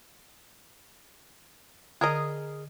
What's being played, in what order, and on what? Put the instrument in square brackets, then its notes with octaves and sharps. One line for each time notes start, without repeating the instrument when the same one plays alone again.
[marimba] D3 [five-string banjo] G#4 A#4 D#5